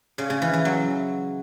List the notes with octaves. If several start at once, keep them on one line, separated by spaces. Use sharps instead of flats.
C#3
C#3
E3
E3
F#3